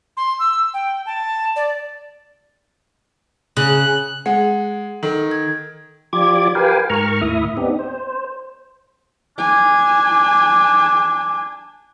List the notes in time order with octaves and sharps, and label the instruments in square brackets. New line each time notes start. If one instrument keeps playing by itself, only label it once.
[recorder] C6
E6
G5
A5
D5
[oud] C#3 [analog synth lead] F#6
[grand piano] G#3 [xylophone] F#5
[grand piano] D#3 [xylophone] A4
[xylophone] G#6
[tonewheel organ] F3 F4 G4 D5 D6 G#6
G4 A#4 B4 F5 G5 G#5
G#2 A#4 A#5 C#6 F6
D#2 A2 E4 E5 D#6
B3 C4 D4 D#4 G4
C5
[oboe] D4 [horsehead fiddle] G#5